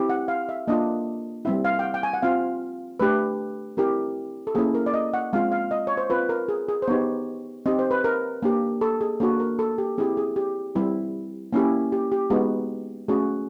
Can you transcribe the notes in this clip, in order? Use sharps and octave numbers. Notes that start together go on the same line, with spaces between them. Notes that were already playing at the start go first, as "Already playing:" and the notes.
Already playing: C4 E4 G4
F#5
F5
E5
A#3 D4 F4 D#5
G3 C4 E4 E5
F5
G5
F#5
G5
G#5
F#5
C4 F4 F5
A3 D4 G4 B4
C4 E4 G4 A#4
A4
A#3 C#4 E4 G#4
A#4
D5
D#5
F#5
G#3 C4 F4 F5
F5
D#5
C#5
C5
C4 F4 B4
A#4
G#4
G#4
C5
B3 D#4 G4 C#5
C4 D#4 G4 D#5
C5
B4
A#4
A#3 D4 G4
A4
G#4
A#3 D4 F#4 A4
A#4
A4
G4
C4 E4 G4 G#4
G#4
G4
G3 C4 E4
A#3 C#4 E4 G4
G4
G4
G#3 B3 D#4 F#4 G#4
A3 C#4 F#4 G#4